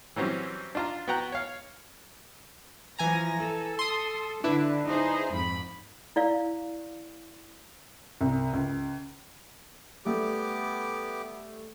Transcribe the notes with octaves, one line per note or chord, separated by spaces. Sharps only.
E3 F#3 G3 C4 C#4
D4 F4 A#5
B3 F#4 G5 A#5 F#6
C#5 F5
E3 F3 G#5 A#5 A#6
A4
C6 D#6
D3 D4 E4 B4
D#4 G#4 C5
F2 G#2 B5
E4 D5 F5
C2
C#2
G3 A3 B3 G4 D6